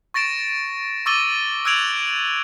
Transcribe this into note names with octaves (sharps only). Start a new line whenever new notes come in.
C#6 A6 A#6 D7 E7
C#6 D6 E6 A6 D#7 G7
E6 F#6 G#6 D7 F7 F#7